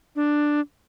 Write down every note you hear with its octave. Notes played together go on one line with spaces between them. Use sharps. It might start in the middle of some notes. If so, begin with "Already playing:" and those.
D4